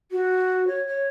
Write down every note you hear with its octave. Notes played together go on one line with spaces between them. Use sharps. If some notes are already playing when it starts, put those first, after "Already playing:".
F#4
C#5
C#5